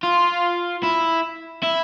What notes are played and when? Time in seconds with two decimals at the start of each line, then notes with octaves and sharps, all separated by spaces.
0.04 F4
0.83 E4
1.63 E4